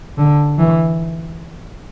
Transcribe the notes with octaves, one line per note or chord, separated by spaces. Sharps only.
D3
E3